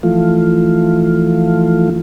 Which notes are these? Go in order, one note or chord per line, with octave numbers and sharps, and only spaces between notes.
E3 F3 A3 F4